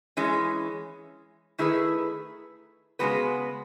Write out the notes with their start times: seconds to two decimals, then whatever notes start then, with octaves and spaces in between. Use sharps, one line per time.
0.17 E3 G#3 C#4
1.58 D#3 A3 E4 G#4 B4
2.99 C#3 G#3 B3 F#4 B4